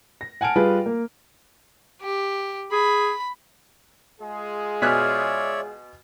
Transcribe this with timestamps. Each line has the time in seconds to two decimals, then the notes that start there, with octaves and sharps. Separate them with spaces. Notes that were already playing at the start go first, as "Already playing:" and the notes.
0.21 A#6
0.41 F#5 G#5 A5 F6 D7
0.56 G3 F4 G#4 B4
0.86 A#3
2.01 G4
2.72 G#4 B5
4.21 G#3 F4 G#4
4.82 B2 C#5 D5 E5 G#5 F6 F#6 B6